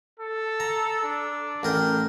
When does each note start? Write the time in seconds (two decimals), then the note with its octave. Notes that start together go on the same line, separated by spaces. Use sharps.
0.20 A4
0.60 A#5
1.03 D4
1.63 A1 A#4 G5